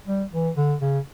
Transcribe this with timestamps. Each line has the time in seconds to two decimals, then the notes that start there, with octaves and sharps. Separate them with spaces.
0.07 G3
0.32 E3
0.57 D3
0.81 C#3